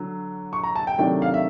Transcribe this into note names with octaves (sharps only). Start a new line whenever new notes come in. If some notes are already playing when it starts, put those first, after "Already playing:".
Already playing: D3 F#3
C#6
A#5
A5
G5
C3 D#3 F#3 A3 D4 G5
F5
E5